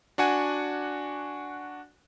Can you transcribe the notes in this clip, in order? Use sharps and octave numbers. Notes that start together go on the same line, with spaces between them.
D4 F#4 F#5 G#5